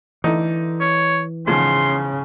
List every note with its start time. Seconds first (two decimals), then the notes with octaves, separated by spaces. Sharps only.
0.24 D3 E3 A3 D#4
0.81 C#5
1.47 E2 G#2 C#3 F3 C6